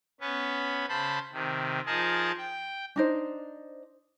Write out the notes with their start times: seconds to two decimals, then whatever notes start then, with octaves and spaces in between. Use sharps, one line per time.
0.20 B3 C#4 B4
0.88 C#3 C5 A5 B5
1.33 C3 D#3
1.86 F3 D#4 G#4 A#4 A5
2.38 G5
2.96 D4 D#4 C5